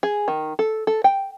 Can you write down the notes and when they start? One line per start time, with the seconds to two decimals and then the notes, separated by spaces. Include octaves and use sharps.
0.03 G#4
0.28 D#3
0.59 A4
0.87 A4
1.04 G5